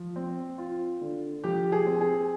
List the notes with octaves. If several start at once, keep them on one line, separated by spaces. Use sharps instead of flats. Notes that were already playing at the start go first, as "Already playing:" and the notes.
Already playing: F3
C4
F4
D3
F3 G4
G#4
C4
G#4